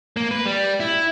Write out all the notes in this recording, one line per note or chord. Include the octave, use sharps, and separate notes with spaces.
A#3
B4
G3
E4